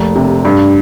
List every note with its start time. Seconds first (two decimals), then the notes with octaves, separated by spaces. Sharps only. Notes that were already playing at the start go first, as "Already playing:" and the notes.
Already playing: F1 A#3
0.16 C3
0.45 G2